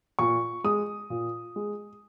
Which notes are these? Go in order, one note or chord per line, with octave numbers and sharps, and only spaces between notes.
A#2 C#6
G#3 D#6
A#2
G#3